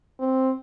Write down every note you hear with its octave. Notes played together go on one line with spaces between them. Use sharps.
C4